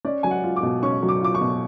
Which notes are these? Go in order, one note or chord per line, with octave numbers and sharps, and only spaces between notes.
C#4 D5
F#3 G#5
F#5
F4
D6
B2
C#4 C#6
F#3
D6
F4 D6
C#6
B2